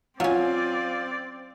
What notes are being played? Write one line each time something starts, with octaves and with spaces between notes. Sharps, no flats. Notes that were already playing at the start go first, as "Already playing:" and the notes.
F#3 C4 C#4 F4 D5